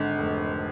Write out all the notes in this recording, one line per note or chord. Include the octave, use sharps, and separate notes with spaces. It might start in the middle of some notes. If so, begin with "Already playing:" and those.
Already playing: G#1 D3
F1